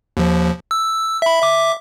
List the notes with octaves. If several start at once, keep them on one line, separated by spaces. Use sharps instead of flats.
D#2 F3
E6
E5 B5
E5 D6